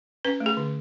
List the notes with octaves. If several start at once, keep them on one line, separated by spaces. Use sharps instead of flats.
C#4 B4
A3
G#4
D3